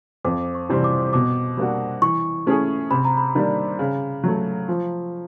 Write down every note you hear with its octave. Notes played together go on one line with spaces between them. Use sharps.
F2 D6
C#6
C3 E3 G3 C4
D6
B2 D6
G3 A#3 D4 F#4
E3 C#6
A3 C#4 E4 G#4
C3 B5
A#5
B5
D#3 G3 A#3 D4
C#3
F#3 A3
F3